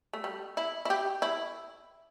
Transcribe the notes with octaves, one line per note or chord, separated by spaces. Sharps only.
A3
G3
E4
E4
G4
E4